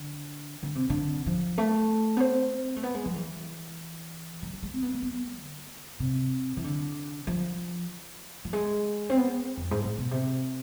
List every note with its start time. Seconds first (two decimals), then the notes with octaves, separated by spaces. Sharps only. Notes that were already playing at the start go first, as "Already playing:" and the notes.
Already playing: D3
0.63 D3
0.75 C3
0.90 D3
1.26 F3
1.58 A3
2.17 B3
2.20 C4
2.76 A3
2.83 B3
2.95 G#3
3.05 F3
3.16 E3
4.42 E3
4.53 E3
4.63 G#3
4.73 C4
4.83 B3
4.93 A3
5.02 B3
5.36 D3
6.00 C3
6.57 E3
6.64 D3
7.27 F3
8.45 F3
8.53 G#3
9.10 C4
9.17 B3
9.57 F2
9.71 G#2
9.85 A2
9.98 B2
10.11 C3